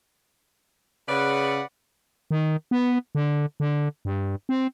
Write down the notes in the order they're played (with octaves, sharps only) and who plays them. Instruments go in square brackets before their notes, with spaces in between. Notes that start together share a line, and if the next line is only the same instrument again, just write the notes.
[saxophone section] C#3 [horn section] B4 D5 F#5
[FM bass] D#3
B3
D3
D3
G2
C4